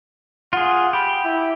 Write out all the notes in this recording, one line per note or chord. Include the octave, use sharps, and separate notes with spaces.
F4 G#4 F#5
G4 B5
E4